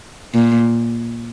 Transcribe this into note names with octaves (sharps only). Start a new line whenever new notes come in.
A#2